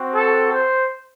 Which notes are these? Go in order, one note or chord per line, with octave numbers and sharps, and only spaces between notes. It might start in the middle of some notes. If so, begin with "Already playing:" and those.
Already playing: C4 F#4
A4
C5